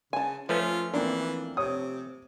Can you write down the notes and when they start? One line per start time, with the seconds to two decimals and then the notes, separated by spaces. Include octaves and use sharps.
0.13 C#3 G#5 A5
0.49 F3 A3 C#4 F4 B4
0.94 E3 A#3 C4 D4
1.57 C3 C#5 D#6